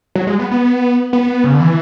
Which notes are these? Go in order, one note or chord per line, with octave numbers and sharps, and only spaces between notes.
F#3
G#3
B3
B3
B3
C#3
D3
E3